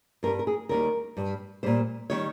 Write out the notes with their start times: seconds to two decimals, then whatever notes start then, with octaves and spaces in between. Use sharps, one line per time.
0.23 G2 A#4
0.27 G3
0.39 A#4
0.47 G#4
0.69 D#2 D#3 G3 A#4
1.17 G2 G3
1.63 A#2 G3 C5
2.10 D#3 G3 C#5